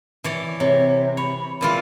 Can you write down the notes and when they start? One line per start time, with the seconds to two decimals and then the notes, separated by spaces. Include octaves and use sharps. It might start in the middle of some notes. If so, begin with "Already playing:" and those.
0.24 E3 C#5 D5
0.60 C3 C#5
1.17 C#5 B5
1.61 A#2 E3 F4 B5